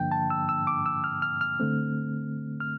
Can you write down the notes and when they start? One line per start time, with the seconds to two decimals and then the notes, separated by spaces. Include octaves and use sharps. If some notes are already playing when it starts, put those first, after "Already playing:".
Already playing: G2 D3 F3 A#3 D4 G5
0.11 A5
0.30 E6
0.49 E6
0.67 D6
0.86 E6
1.04 F6
1.22 F6
1.41 F6
1.60 D3 A3 C4
2.60 F6